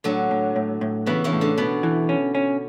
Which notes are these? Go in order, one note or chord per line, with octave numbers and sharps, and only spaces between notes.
A2 D3 F#3
A2
A2
A2
C#3 E3 B3
C#3 E3
A2
D3
B2 B3
E3
C#4
C#4